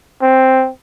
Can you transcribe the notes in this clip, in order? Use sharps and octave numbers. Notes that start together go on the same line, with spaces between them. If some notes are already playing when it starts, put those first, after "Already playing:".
C4